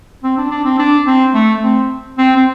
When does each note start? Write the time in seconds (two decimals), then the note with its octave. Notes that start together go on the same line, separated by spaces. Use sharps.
0.24 C4
0.37 D4
0.51 D4
0.65 C4
0.79 D4
1.07 C4
1.34 A3
1.63 C4
2.18 C4
2.36 C4